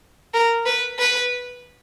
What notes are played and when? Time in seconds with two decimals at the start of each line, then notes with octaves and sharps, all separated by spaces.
0.34 A#4
0.66 B4
0.99 B4